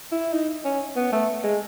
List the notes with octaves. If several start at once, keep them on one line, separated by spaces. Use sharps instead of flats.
E4
D#4
C#4
B3
A3
G#3